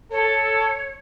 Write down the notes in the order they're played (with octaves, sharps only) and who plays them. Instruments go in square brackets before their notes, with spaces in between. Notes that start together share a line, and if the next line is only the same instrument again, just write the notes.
[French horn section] A4 [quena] C#5